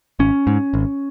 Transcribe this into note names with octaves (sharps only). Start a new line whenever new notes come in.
G#1 C#4
G#2
G#1